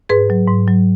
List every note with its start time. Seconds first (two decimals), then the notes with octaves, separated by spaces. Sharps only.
0.09 G#2 G#4 B4
0.30 F#3
0.48 G#2
0.67 F#3